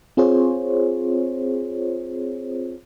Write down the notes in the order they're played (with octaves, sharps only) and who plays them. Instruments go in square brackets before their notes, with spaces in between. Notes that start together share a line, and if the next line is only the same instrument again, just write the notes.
[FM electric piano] C4 F4 G#4 C5 C#5